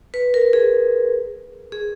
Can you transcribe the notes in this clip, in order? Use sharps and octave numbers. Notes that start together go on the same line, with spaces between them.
B4
A#4
G#4
G#4